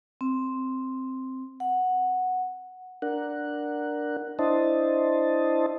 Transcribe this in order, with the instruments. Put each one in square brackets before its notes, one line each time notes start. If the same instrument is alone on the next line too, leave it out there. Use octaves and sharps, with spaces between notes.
[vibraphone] C4
F#5
[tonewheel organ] D4 A#4 F#5
D4 E4 C5 D#5 A5